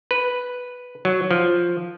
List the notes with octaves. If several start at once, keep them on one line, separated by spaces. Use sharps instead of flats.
B4
F#3
F3